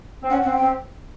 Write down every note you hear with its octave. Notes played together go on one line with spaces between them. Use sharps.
C4
C#4 F#5
C4 F#5
G5
C4